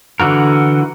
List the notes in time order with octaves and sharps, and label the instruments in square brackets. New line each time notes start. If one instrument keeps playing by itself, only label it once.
[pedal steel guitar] D3 E3 F#4 A#4